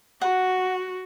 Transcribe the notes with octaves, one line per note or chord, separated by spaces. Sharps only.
F#4 F#5